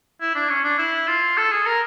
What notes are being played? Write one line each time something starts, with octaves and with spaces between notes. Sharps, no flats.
E4
D4
C#4
D4
E4
F4
A4
G#4
A#4